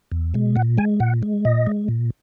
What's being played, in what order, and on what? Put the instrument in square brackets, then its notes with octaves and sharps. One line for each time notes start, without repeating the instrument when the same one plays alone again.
[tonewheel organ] E2
B2 G#3
A#2 F#5
G#3 G#5
A#2 F#5
G#3
A#2 D#5
G#3
A#2